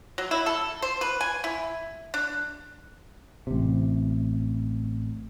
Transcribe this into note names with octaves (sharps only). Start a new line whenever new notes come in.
F#3
E4
A4
C5
B4
G#5
E4
D4
A1 C3